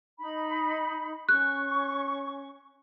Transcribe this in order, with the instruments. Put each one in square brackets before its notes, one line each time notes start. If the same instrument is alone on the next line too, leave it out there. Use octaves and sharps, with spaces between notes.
[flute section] D#4 B5
[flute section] C#4 C#6 [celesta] F#6